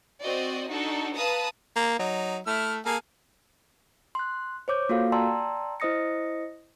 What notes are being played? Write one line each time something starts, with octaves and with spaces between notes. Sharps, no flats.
C4 F#4 D5 D#5
D4 D#4 F#4 A4
B4 F5 A5 A#5 D#6
A#3
F#3 D#4
A3 E4 F6
A#3 G#4 A4 F5
C6 F#6
C5 C#5 D6 G6
A#3 F4 F#4 A4 A#4 F5
D5 G5 A5 A#5 C6 E6
E4 C5 D#5 D#6 A#6 C#7